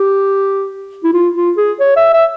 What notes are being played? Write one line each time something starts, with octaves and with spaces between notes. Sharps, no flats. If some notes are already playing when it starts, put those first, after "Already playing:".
Already playing: G4
E4
F4
F4
G#4
C#5
E5
E5